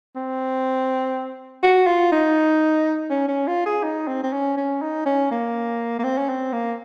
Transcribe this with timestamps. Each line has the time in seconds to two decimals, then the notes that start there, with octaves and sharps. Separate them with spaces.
0.16 C4
1.63 F#4
1.87 F4
2.12 D#4
3.10 C#4
3.28 C#4
3.47 F4
3.66 G#4
3.83 D#4
4.08 C4
4.23 C4
4.33 C#4
4.57 C#4
4.82 D#4
5.06 C#4
5.31 A#3
5.99 A#3
6.04 C4
6.18 C#4
6.29 C4
6.53 A#3